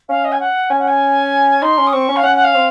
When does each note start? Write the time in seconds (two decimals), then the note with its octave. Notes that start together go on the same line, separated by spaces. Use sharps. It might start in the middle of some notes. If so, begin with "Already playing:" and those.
0.09 C#4 F5
0.25 D#5
0.32 G#5
0.40 F#5
0.70 C#4 G#5
0.79 F#5
0.88 G#5
1.62 D#4 C6
1.78 C#4
1.87 D#6
1.93 C4 C#6
2.08 C#4
2.16 F5
2.23 C#4 F#5
2.36 F#5
2.44 F5
2.54 C4